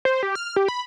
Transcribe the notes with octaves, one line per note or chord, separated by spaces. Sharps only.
C5
G4
F6
G4
B5